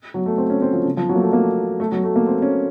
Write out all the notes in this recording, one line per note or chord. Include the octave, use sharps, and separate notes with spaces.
F#3
A3
C4
C#4
C4
F3
C#3
F3
F#3
A#3
A3
A#3
A3
F#3
A3
A#3
C4
C#4